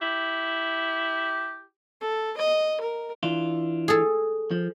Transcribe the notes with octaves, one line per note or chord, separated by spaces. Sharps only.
E4 G4
A4
D#5
A#4
E3 D4 F4
G#4 A4
F3